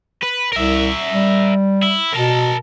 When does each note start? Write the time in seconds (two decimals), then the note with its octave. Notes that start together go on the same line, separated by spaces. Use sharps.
0.23 B4
0.52 C2 A#4 E5
1.12 G3
1.83 E4
2.14 B2 A#4 A5